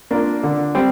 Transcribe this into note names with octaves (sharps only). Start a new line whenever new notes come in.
A#3 D4 F4 A#4
D3
G3 C4